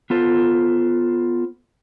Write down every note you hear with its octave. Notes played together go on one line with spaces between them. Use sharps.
B3 F4 A4 C5